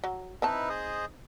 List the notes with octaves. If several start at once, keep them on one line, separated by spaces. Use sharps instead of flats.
F#3
D#3 C4 D#4 E4 B4 A5
G#4 C5 D#5